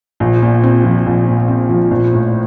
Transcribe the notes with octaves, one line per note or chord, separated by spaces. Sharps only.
A#1
A#2
C4
F3
A#1
A#2
C4
F3
A#1
A2